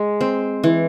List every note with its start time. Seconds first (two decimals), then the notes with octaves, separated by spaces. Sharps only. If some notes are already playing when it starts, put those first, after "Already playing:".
Already playing: G#3
0.21 C4
0.64 E3